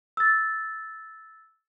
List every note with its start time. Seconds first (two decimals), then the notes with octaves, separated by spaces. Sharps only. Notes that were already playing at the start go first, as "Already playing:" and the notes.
0.17 E6 A6